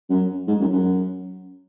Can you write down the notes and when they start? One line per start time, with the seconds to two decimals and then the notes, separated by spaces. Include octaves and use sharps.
0.10 F#2
0.47 G#2
0.60 F#2
0.73 F#2